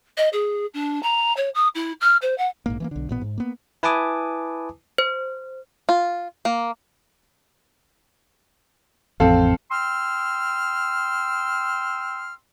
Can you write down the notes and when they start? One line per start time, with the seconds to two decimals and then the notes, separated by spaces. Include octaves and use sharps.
0.17 D#5
0.33 G#4
0.74 D4
1.03 A#5
1.37 C#5
1.55 D#6
1.75 E4
2.01 F6
2.22 C5
2.38 F#5
2.66 A#1 G#2 A#3
2.80 E3 A3 A#3
2.91 B1 D3
3.09 A1 A#2 B3
3.21 G#2
3.38 A#3 B3
3.83 E4 B4 G#5 A5 D6 D#6
4.98 C5
5.89 F4
6.45 A#3
9.20 A1 F2 C4 A4 F5
9.72 G5 C6 E6 F6